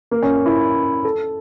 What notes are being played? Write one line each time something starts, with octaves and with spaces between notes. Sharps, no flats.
A#3
C#4
E4
A4